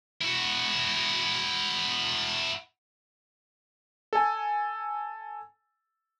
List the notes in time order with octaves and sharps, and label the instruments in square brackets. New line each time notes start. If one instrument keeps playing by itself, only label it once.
[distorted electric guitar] E4 F#4
[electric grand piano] A4 G#5